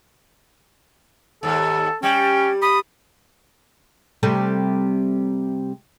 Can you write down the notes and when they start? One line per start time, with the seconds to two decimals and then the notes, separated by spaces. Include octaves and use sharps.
1.43 D#2 G#2 A4
2.03 G3 C#4 G5
2.62 B5 D#6
4.23 C3 G3 A3